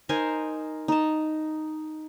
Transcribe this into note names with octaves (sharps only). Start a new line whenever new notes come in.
D#4 A#4 C5 G#5
D#4 A5